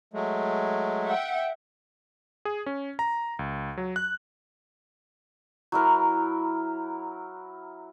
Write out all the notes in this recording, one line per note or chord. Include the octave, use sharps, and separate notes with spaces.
F#3 G#3 A3
E5 F#5 G5
G#4
C#4
A#5
C#2
F#3
F#6
F#3 E4 A#4